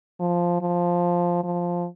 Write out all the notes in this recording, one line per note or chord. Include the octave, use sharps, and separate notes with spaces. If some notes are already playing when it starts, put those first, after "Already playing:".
F3
F3
F3